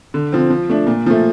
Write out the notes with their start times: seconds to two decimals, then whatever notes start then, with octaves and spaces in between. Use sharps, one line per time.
0.14 D3
0.32 F3 C4
0.50 F3
0.69 A3 D4
0.87 A#2
1.06 F3 A3